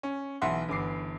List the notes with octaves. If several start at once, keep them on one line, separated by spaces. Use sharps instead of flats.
C#4
B1 E3 B4 E5 F#5 C6
G1 E3 D6 C7